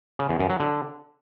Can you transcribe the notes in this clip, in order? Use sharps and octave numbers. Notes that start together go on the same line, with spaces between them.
C#3
E2
F#2
F#3
D3